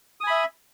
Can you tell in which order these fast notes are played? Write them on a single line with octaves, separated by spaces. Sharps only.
D#6 G#5 B5 E5